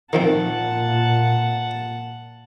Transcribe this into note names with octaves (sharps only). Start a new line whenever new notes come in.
A#2 D#3 F3 C4 F#5 A5